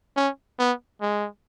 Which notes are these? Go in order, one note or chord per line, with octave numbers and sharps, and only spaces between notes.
C#4
B3
G#3